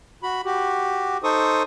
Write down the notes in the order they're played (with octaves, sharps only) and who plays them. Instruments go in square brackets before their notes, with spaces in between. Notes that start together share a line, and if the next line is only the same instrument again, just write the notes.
[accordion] F#4 B5
F#4 G4
D#4 A4 C5 C#6 D#6